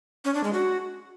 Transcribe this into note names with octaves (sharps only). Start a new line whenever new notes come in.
C#4
D4
G#3
F#4